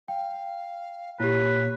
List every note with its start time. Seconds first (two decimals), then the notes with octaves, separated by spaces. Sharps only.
0.08 F5 G5
1.20 A#2 E4 G4 B4 C#5